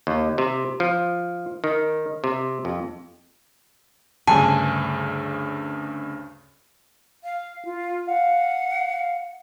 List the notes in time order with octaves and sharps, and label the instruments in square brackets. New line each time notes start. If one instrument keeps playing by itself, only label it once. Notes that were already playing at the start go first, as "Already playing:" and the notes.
[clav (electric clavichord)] D#2
C3
F3
D#3
C3
F2
[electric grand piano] D2 G2 C#3 [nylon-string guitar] G#5 [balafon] A5
[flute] F5
F4
[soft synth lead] F5 [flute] F#5